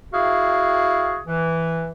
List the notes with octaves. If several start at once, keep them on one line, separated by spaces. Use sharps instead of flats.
E4 F#4 G#4 F5
E3